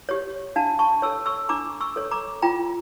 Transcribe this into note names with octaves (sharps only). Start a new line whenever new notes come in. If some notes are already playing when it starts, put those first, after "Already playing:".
G4 C#5
D4 F5 A5
A5 C#6
A4 C#5 C#6 E6
C#6 E6
D4 A#5 D6
C#6 E6
A4 C#5
A#5 D6
F4 G5 A#5